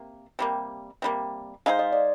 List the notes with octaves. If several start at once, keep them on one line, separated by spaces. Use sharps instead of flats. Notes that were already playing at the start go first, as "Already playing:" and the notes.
Already playing: C3 A#3
C3 G3 A#3
C3 G3 A#3
G#3 D#4 G#4 C5 F5
D#5
D5